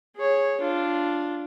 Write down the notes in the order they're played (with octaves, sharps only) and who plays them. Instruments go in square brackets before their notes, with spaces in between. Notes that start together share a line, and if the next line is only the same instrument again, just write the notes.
[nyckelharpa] G#4 C#5
D4 F4